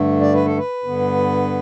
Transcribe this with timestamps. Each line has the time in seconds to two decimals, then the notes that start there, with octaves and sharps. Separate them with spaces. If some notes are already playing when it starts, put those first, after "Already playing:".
Already playing: G2 D3 A3
0.21 D5
0.34 B4
0.46 A4
0.57 B4
0.84 G2 D3 B3